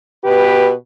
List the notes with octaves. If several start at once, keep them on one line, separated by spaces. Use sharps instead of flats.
B2 G4 B4